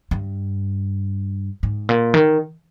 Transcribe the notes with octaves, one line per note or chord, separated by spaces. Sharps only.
G2
G#2
A#2
D#3